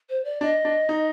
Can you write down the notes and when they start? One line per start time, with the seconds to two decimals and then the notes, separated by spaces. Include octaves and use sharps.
0.09 C5
0.25 D5
0.41 D4 D#5
0.65 D4
0.89 D#4